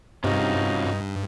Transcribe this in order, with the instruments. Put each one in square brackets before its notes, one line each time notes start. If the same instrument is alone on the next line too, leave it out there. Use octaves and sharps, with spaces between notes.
[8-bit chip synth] G2 [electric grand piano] C3 [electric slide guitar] C#4 F4 F#4 [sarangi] D#4